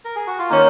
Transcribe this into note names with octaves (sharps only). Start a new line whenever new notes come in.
A#4
G#4
F#4
F4
D#3 A#3 C#4 D#4